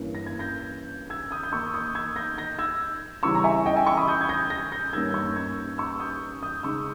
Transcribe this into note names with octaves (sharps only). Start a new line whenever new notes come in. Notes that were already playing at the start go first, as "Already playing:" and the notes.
Already playing: G2 E3 A#3 C#4
A#6
G#6
G6 A#6
E6 G#6
D#6 G6
G6
D#3 A#3 D#4 C#6 E6
D#6 G6
E6 G#6
G6 A#6
G6 A#6
E6 G#6
C#3 E3 G3 C#4 C#6 E6
A#5
E5 G#5
D#5 G5
E5 G#5
C#6 E6
B5 D#6
D#6 G6
G#6
G6 A#6
G6 A#6
G6 A#6
G2 D#3 G3 A#3 C#4 E6 G#6
G6
C#6 E6
E6 G#6
C#6 E6
E6
D#6 G6
D#6 G6
C#3 G#3 D#4 C#6 E6